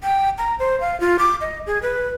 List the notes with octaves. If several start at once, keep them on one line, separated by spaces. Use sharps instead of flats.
G5
A#5
C5
F5
F4
D6
D#5
G#4
B4